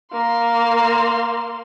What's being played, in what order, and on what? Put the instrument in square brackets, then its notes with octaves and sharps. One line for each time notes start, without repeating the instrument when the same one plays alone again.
[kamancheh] A#3 C6